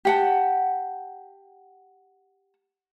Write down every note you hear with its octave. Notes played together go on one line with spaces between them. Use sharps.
G4 F#5 A5